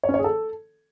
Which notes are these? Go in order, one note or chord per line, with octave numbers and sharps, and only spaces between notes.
C#5
C#4
C#5
G#4
A4